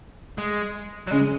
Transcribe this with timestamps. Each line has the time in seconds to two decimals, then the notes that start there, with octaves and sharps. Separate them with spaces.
0.38 G#3
1.07 F#3
1.12 C#3 G#3